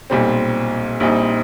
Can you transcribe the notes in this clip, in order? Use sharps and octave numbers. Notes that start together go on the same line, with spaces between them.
B1 A#2 G3 C4
A#1 A#2 G3 C4 D#4